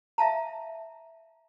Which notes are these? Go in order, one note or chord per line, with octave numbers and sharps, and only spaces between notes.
E5 F5 A5 A#5